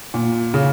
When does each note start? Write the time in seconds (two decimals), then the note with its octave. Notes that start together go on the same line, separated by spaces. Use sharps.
0.14 A#2
0.54 C#3